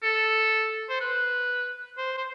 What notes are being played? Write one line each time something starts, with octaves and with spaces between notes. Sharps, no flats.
A4
C5
B4
C5
C5